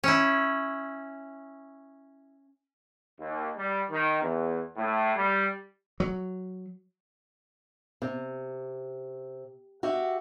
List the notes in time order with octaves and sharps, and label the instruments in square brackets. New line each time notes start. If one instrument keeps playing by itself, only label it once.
[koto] C#4 E4
[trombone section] D#2
G3
D#3
E2
A2
G3
[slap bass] F#3
[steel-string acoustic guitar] C3
F#4 G4 E5